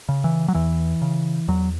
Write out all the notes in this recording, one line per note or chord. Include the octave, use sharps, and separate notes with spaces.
C#3
E3
F#3
E2 E3
C#3
E2 F#3